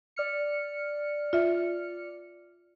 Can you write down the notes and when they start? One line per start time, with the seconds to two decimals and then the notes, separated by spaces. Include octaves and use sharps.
0.16 D5 F6 C#7
1.33 F4 E5